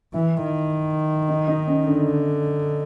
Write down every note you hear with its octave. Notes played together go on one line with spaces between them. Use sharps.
E3 E4
D#3
D#4
D#4
C#4
D3 D4